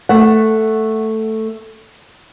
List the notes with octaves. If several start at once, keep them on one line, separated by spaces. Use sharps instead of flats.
A3 F#5